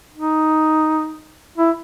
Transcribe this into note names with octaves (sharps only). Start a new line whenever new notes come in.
D#4
E4